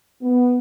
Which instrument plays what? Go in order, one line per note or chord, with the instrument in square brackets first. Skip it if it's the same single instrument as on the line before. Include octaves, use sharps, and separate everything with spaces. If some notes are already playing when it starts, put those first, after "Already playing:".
[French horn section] B3